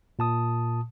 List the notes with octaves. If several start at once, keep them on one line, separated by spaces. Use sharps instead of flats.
A#2 A5 D#6